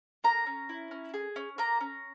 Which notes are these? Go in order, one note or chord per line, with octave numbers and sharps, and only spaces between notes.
A#3 A#5
C#4
E4
C#4
G#4
C#4
A#3 A#5
C#4